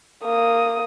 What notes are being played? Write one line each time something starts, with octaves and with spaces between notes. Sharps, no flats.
A#3 D#6